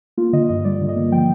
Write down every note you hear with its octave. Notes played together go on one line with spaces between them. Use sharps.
A#3 F4
D3 D#5
G2 D#5
G3 D5
D3
D#5
A#3
F3 G5